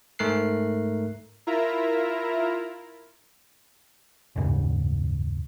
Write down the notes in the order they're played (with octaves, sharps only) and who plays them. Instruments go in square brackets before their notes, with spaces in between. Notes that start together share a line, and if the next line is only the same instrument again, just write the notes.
[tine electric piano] G#2 A3 A#4 F#6 C7
[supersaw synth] E4 F4 A#4 E5 A#5
[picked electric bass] F#1 D#2 G#2 C#3